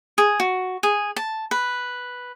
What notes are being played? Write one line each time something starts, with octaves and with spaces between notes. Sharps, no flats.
G#4
F#4
G#4
A5
B4